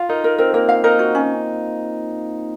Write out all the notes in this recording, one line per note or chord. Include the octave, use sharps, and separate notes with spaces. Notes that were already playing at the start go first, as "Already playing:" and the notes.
Already playing: F4 F5
D#4 A#4
A#4
C4 A#4
A#3 A#4
F5
D#4 A#4
F#4
C#4